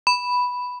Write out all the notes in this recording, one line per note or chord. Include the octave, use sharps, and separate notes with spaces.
B5